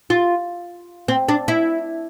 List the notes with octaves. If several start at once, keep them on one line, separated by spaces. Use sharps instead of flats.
F4
C4
D4
E4